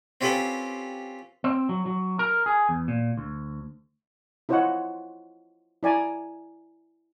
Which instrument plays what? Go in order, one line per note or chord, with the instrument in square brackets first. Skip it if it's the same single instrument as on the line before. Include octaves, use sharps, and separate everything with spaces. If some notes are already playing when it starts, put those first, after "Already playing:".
[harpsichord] C4 C#4 F4 G4 A4 B4
[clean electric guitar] C4
F#3
F#3
A#4
G#4
E2
A#2
D2
[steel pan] E4 F4 C5 C#5 D#5 F#5
E4 D5 G#5 A#5